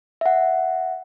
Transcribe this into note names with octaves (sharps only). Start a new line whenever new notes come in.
E5 F#5